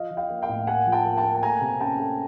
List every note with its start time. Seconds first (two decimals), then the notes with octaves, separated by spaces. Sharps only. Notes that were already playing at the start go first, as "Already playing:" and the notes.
Already playing: F3 D#5 F5
0.11 F3
0.17 F5 G5
0.30 A#3
0.42 F5 G5
0.49 A2
0.67 A#3 F#5 G#5
0.86 F3
0.92 G5 A5
1.05 A#3
1.17 G5 A5
1.24 A#3
1.35 A5
1.43 A3 G#5 A#5
1.61 C3
1.80 C#4 G5 A5
1.99 A3